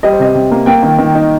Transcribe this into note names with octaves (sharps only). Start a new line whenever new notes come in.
G3 D#5
C5
C3 D#5
C3
A#3
A#3 G5
D#3
D#3
D#4